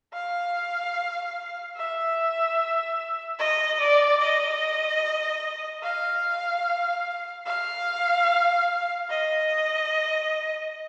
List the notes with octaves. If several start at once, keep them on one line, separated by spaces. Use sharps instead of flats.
F5
E5
D#5
D5
D#5
F5
F5
D#5